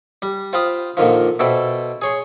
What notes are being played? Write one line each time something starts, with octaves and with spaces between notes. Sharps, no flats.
G3
F4 C5 F5 G5 B5 D#6
A#2 D3 D#3 F3
B2 E4 A4 C5 D5 G5
G#4 C#5 C6